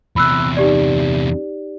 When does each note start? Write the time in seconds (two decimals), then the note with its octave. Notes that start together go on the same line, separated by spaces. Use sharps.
0.16 E2 C3 B5 E6 F#6
0.57 D#4 G4 D5